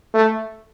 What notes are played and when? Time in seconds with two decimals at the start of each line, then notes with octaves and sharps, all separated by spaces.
0.14 A3